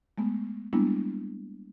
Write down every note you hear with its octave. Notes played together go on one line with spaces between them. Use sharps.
G#3 A3 B3
G3 G#3 A#3 B3 D4 E4